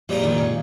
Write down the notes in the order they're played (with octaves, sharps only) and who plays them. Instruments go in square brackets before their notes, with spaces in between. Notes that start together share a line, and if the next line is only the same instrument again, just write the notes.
[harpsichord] A#2 F3 G#3 D#4 [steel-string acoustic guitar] G3
[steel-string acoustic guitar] D#3
C#3